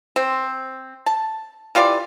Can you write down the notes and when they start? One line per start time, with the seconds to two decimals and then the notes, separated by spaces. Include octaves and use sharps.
0.16 C4
1.06 A5
1.75 E3 F4 G4 D5